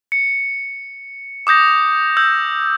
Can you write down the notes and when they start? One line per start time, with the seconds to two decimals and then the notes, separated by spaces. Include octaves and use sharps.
0.12 C#7
1.47 D6 D#6 G6 A#6
2.17 E6 G6